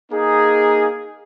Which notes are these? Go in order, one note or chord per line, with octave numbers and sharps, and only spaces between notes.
A#3 D#4 G#4